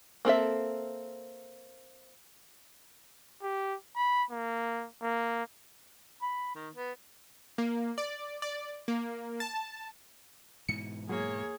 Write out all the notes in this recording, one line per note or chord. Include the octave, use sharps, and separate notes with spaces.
A#3 C4 A4 E5
G4
B5
A#3
A#3
B5
D#3
B3
A#3
D5
D5
A#3
A5
G#2 B2 E3 C#7
F#3 A#3 G#4 C#5